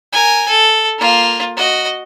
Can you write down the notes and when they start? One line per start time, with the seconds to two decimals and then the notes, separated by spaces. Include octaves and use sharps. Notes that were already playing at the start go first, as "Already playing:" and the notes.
0.13 A#4 G#5
0.48 A4
0.99 A#3 F4
1.57 F#4 D#5